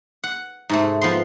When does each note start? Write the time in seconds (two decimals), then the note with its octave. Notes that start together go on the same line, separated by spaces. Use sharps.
0.24 F#5
0.69 G#2 C3 A3
1.01 F3 B3 C6